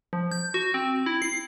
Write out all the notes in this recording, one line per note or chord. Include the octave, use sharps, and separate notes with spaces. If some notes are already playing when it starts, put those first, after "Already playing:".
F3
G6
F#4
C4
E4
C7